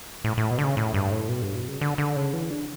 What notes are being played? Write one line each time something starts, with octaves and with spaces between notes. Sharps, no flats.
A2
A2
B2
D3
C#3
A2
G2
A2
B2
G2
B2
C#3
D3
D3
C#3
E3
D4